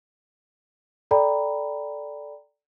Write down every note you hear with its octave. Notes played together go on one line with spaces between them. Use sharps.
A4 D5 G5 A#5 B5